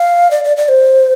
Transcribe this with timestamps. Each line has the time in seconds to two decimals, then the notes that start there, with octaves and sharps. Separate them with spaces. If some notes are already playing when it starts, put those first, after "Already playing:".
Already playing: F5
0.31 D5
0.44 D5
0.57 D5
0.69 C5